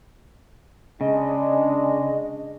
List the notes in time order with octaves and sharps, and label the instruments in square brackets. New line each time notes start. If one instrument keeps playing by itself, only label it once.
[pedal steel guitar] C#3 [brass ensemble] G#3 D4 [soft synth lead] D#5